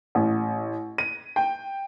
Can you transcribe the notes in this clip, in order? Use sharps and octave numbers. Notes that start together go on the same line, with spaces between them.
A1
D#7
G5